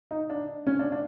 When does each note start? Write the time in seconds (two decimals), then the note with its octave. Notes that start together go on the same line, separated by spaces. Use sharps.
0.11 D#4
0.30 D4
0.67 C#4
0.79 D4
0.92 D4